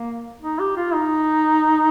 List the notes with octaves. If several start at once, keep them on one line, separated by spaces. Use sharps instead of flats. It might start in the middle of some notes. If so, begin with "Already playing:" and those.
Already playing: A#3
D#4
G4
F4
D#4